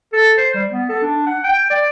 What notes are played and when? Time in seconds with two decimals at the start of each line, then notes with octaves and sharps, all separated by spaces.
0.13 A4
0.38 C5
0.54 G3
0.72 B3
0.89 A4
1.02 D4
1.26 F#5
1.44 G5
1.70 D5